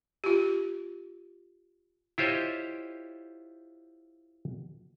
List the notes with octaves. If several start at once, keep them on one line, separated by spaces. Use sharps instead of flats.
F4 G4
E4 F4 G4 C5 C#5 D#5